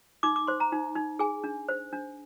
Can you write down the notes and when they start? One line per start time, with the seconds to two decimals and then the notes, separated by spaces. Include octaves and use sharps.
0.23 D#4 D6
0.36 D6
0.47 C5 C6
0.60 A#5
0.72 D#4
0.96 D#4
1.19 G#4 G#5
1.44 D4
1.69 C5
1.93 D4